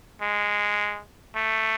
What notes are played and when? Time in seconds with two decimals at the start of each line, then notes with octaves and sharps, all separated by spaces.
0.21 G#3
1.36 A3